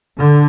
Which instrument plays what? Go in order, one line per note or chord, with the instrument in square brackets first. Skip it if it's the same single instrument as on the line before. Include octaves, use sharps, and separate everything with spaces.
[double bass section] D3